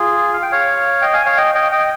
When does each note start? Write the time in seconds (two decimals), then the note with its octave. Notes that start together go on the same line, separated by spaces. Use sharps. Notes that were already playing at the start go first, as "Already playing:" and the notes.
Already playing: F4 G#4
0.34 F5
0.42 G5
0.52 C#5 F5
1.02 D#5 G5
1.13 F5 G#5
1.25 C#5 F5
1.37 D#5 G5
1.55 D#5 G5
1.72 D#5 G5